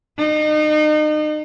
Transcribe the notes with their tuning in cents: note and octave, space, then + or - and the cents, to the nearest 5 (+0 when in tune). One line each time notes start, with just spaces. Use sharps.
D#4 -35